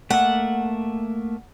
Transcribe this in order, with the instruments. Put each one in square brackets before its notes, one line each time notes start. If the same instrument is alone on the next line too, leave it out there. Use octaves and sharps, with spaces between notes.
[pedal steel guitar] A3 A#3 E5 [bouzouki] F#5